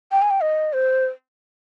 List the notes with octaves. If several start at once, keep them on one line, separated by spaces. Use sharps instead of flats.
G5
G#5
G5
D#5
C5